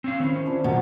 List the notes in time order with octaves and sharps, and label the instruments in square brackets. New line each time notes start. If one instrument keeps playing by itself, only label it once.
[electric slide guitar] C4 C#4 F5
[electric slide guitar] D#3 C#4 [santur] C4 E4
[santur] F3 D4 E4
[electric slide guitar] F#2 [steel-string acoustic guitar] B2 [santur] G4 A#4